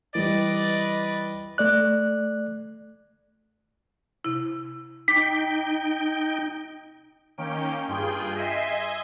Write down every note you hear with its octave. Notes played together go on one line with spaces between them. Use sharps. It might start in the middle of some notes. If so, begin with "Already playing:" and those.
E3 G3 B4 D5 D#5
A3 D5 F#6
C3 E4
D#4 G5 D6 B6
D#3 A#3 C#4 G5 D7
G2 F4 G#4 G5
D#5 E5 G#5 C6